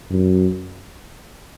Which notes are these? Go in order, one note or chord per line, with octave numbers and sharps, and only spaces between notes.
F#2